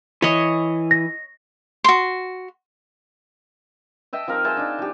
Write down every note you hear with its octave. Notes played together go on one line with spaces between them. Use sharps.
E3 C#5 D#5
A#6
F#4 C6
D#5 E5 G5 A5
F3 C4 D#4 A#4
G#4 C5 E5 A5
D4 D#4
F3 G4